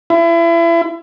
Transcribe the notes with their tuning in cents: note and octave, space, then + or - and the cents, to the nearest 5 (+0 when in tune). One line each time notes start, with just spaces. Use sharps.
E4 +30